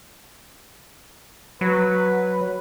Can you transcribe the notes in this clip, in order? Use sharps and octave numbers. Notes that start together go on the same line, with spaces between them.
F#3 B4